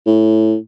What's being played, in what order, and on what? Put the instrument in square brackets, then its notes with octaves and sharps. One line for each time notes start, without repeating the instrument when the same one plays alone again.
[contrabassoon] A2